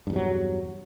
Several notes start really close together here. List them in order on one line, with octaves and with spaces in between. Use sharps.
G2 E2 C3 F#3